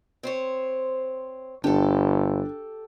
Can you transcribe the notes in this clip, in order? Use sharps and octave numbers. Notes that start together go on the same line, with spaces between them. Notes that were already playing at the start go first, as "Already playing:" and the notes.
C4 C5 C#5
G1 D4 G4 A4